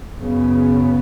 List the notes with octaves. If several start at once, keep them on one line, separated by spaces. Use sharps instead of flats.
F#2 C#3 B3